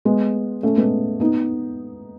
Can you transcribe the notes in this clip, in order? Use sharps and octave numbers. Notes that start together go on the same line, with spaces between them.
G#3 B3
A3 C#4
G#3 B3
B3 D#4